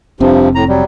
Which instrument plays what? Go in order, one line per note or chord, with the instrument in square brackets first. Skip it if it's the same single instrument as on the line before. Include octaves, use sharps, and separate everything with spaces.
[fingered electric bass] F1 C4 [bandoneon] G2 C3 F3
[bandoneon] A2 A#5
F#3 G3